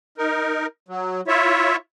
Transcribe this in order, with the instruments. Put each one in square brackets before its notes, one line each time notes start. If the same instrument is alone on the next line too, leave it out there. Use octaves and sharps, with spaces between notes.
[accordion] D#4 A#4
F#3
E4 F4 C#5 E5